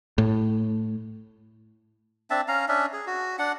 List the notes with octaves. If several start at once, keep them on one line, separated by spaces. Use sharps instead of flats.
A2
C4 D4 E5 A5
C#4 F5 A#5
C#4 D4 E5
G#4
F#4
D4 F#5